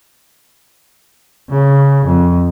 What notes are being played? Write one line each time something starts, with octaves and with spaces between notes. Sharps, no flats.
C#3
F2